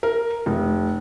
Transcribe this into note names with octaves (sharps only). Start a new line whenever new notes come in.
A#4
F1